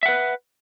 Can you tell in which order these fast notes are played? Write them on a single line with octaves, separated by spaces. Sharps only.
E5 F#5 B4